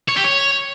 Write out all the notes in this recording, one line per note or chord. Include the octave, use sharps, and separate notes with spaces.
C#5
G4
C#5